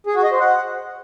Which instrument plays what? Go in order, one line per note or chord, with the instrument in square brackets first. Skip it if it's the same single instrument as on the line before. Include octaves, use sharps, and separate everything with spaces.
[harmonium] G#4
F#4
D#5
C5
F#5